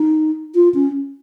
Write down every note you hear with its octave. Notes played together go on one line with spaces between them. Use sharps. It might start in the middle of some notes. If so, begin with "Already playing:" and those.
Already playing: D#4
F4
C#4